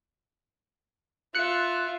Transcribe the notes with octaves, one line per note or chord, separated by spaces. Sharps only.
F4 E5 F#6 C#7